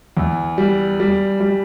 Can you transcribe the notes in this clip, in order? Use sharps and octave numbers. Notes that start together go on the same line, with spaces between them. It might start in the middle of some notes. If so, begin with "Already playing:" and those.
E2
G3
G3
G3